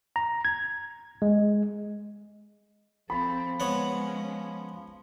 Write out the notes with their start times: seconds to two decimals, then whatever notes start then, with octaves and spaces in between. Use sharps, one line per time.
0.16 A#5
0.45 G#6
1.22 G#3
3.10 F3 C4 A4 B5
3.60 G#3 B3 C#4 C#5 F#5